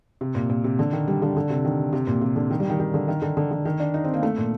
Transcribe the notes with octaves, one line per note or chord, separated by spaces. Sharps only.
C3
A#2
A#2
C3
D3
D#3
G3
D3
D3
C3
D#3
C3
A#2
C3
D3
D#3
G3
D#3
D#3
D3
D#3
D3
D3
D3
D#3
D4
D#4
C4
A#3
A3
A#2